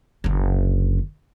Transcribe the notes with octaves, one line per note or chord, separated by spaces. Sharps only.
F#1 D3